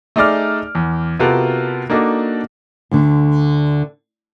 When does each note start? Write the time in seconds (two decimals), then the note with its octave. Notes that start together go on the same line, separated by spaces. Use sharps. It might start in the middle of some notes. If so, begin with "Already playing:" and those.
0.16 A3 D#4 G#4 D5 D6 F6
0.75 E2
1.19 C3 B3 F4 F#4 A4 A#4
1.90 A#3 D4 D#4 F#4 A4
2.91 D2 D3